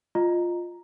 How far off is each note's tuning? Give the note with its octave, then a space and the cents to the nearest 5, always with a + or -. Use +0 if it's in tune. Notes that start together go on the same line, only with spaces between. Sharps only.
F4 +0 D#5 -15 A#5 +0